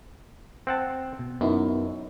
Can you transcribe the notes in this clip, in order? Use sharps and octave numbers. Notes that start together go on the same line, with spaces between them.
C4 F#5 A5
B2
F#2 B3 D#4 E4